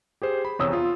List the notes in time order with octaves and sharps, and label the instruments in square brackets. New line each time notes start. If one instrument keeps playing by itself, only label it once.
[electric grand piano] G4 G#4 C5
B5
[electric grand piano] E2 C3 [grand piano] C#5 D#6 E6
[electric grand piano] F4